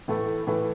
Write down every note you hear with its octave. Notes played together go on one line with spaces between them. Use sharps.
A2 E3 A3
A2 E3 A3